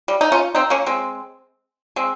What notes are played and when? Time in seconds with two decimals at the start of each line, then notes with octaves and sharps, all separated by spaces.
0.08 G3
0.21 D#4
0.32 C#4 F4
0.55 C4 D#4
0.70 A#3 C#4
0.86 G#3 C4
1.96 G#3 C4